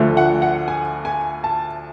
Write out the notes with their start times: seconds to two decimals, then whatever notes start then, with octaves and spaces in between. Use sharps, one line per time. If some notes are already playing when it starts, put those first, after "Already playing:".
Already playing: D2 D3 F3 A3
0.17 F#5
0.42 F#5
0.68 G#5
1.05 G#5
1.44 A5